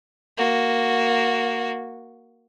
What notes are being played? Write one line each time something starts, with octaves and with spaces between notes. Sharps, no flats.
A#3 F#4